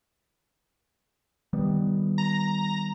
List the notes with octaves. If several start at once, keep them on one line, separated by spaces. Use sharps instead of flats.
D#3 G3 B3
A#5